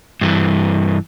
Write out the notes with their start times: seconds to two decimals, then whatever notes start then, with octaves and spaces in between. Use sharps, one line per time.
0.21 G2 E3